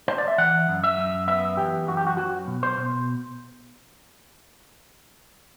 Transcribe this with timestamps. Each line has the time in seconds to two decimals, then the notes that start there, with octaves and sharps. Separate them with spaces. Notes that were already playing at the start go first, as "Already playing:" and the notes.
0.08 C5
0.18 D5
0.28 E5
0.38 E3 F#5
0.68 F#2
0.84 E5
0.98 F#2
1.28 B3 E5
1.57 E3 G4
1.88 F#2 F#4
1.97 G4
2.07 F#4
2.17 F#3 F#4
2.47 B2
2.63 C5
2.77 B2